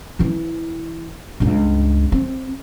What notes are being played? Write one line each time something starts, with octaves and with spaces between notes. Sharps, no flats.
E3 E4
C#2 G2
C4